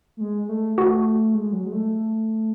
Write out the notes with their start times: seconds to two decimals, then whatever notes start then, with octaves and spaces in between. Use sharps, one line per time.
0.17 A3
0.21 G#3
0.43 G#3
0.49 A3
0.78 A3 F#4
1.34 G#3
1.53 F#3
1.66 G#3
1.72 A3